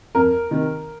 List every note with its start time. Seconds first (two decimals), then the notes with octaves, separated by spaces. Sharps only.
0.15 F2 A#4
0.51 C3 D#3